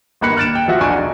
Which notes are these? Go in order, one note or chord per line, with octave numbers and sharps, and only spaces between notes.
G1 D#3 A#3 B5 F#6 C#7
F6 F#6 A6 D7 E7
G5
F3 F4 F#4 E5 F#5
B1 E2 D4 G#5 C#6 D7
D#4